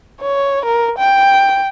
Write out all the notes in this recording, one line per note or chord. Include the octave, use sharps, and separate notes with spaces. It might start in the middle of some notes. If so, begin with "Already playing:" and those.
C#5
A#4
G5